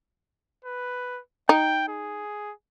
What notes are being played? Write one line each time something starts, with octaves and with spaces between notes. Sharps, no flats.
B4
D#4 G5
G#4